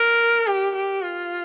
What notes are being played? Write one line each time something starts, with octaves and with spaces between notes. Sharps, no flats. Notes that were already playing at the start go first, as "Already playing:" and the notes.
Already playing: A#4
G4
G4
F4